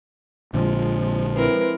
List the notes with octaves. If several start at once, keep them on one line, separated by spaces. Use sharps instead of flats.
A#1 A#2 D3 F3 G#3 F4
C4 E4 A#4 B4